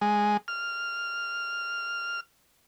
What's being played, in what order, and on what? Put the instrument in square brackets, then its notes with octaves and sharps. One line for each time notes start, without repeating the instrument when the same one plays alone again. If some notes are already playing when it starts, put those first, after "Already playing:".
[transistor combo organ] G#3
F6